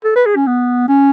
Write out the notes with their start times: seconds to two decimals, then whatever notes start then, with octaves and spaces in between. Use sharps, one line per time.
0.04 A4
0.15 B4
0.26 G#4
0.36 C#4
0.47 B3
0.88 C#4